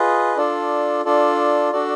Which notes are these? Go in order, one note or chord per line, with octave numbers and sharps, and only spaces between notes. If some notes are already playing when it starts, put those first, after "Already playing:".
Already playing: F4 G#4 B4 D#5
D4 F4 A4 D5
D4 F4 A4 D5
D4 F#4 A4 D5